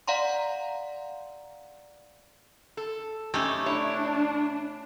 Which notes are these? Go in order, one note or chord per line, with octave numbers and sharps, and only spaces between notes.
D5 F5 F#5 A#5 C6
A4
F#2 A3 C#4 D#4 G4
B2 D4 E4 C#5